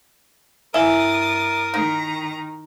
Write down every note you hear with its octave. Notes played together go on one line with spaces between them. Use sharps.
G2 E4 A#4 E5 G#5 D#6 A6
D#3 D#4 A#5